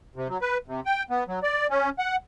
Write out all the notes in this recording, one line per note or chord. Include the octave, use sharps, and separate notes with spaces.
C3
F#3
B4
C3
G5
B3
F#3
D5
C#4
F#5